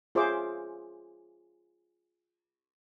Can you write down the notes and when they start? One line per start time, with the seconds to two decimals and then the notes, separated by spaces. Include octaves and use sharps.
0.15 F4 G#4 C5 C#5 E5 D6